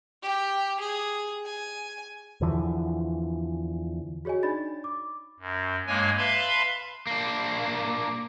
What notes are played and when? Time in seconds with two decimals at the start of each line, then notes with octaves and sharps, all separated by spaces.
0.23 G4
0.80 G#4
1.45 G#5
2.41 E2 D3 E3 F3
4.25 F#4 G#4 C#5 D#5 G#5
4.43 D4 D#4 D5 B5 A6
4.84 D6
5.40 F#2
5.87 G2 G#3 A#3 C#5 G#5
6.18 B4 E5 F5 A5 B5 C6
7.07 A#3 D4